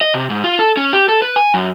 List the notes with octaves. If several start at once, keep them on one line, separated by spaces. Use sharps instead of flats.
D#5
C3
G#2
F4
A4
C#4
G4
A4
B4
G#5
F#2